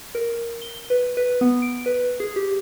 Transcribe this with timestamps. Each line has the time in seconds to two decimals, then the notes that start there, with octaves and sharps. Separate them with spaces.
0.15 A#4
0.62 G7
0.90 B4
1.17 B4
1.41 B3
1.62 D7
1.86 B4
2.20 G#4
2.36 G4